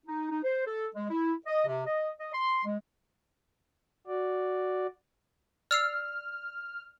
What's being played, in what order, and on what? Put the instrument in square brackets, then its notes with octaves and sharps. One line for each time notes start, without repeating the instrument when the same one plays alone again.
[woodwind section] D#4
D#4
C5
A4
G#3
E4
D#5
C3
D#5
D#5
C6
G#3
[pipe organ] F#4 D5
[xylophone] D5 E6 C7 [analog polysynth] F6